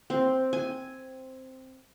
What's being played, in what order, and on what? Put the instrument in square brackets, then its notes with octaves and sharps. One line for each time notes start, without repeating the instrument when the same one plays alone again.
[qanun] C4
G#5